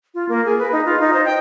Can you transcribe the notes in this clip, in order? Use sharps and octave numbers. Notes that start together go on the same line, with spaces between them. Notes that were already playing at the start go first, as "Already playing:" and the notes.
F4
A#3
G#4
B4
D#4
F4
D#4
C5
G5